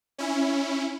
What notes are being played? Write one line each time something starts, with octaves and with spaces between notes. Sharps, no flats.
C#4 E4